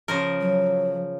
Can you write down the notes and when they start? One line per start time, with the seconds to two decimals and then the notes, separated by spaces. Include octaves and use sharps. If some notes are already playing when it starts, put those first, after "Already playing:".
0.08 C#3 F3 A#4
0.41 F#3